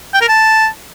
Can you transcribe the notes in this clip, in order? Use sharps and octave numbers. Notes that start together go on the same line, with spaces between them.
G5
A#4
A5